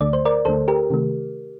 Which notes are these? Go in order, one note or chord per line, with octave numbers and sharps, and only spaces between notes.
D2 D3 A3 D5
C5
A#4 D5
D2 D3 A3 A4 C5
G4 A#4
C3 D#3 A3